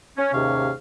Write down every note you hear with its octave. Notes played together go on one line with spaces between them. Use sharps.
C#4
D#2 G#2 C3 C#4 C#5 F5